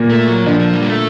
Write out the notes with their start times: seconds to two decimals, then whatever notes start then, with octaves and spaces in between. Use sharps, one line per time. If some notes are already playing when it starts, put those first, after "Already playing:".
Already playing: A#2 A#3
0.10 A3
0.28 F#3
0.46 D3 F3 D4
0.60 F3
0.74 G3
0.83 A#3
0.87 A3